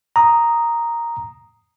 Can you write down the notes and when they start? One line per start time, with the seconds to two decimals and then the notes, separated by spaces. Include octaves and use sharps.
0.16 A#5 D#6